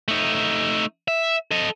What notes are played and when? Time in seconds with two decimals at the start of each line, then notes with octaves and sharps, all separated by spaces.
0.08 A3 D#4
1.08 E5
1.51 A4 D#5